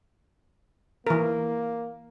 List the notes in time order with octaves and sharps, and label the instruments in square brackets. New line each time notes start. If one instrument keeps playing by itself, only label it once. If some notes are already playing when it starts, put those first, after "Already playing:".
[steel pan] E3 A#4 [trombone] A#3